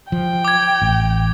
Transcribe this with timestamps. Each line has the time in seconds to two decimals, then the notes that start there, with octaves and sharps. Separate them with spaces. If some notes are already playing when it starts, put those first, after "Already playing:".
0.12 F3 G5
0.45 D6 G#6
0.82 A1